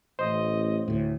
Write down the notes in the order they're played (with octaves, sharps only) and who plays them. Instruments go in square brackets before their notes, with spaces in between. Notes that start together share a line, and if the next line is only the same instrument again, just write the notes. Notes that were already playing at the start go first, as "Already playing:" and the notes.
[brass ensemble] A1 [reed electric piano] C5 [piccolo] D#5
[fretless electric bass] D2 A2